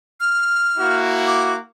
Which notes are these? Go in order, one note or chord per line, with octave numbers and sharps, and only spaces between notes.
F6
A#3 E4 F#4
D6